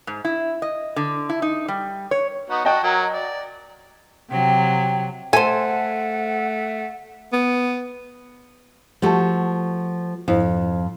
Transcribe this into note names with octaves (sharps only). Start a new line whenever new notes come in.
G#2
E4
D#5
D3
E4
D#4
G3
C#5
B3 D#4 F#4
F#4 D#5 G5 A5
F#3 A#4
D5
C3 F#3 G5
A3 A4 C5 F#5 G#5
B3
F3 A3 F#4 G4 A5
F2 G#2 E4 C5